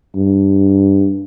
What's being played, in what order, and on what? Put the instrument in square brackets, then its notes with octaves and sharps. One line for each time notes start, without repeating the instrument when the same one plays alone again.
[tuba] G2